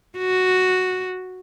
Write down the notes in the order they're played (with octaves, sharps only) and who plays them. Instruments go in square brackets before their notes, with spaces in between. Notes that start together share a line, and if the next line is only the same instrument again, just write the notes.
[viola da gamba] F#4